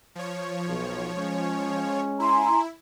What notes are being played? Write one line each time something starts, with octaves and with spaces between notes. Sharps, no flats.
F3 C#5
B1
G#3 C#4
E4 G#5 A#5 C6